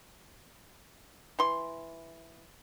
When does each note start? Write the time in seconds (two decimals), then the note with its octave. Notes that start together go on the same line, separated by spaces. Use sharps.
1.39 E3 C6